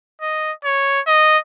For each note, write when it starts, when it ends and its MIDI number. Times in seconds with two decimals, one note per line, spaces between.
0.21 0.52 75
0.65 1.00 73
1.07 1.38 75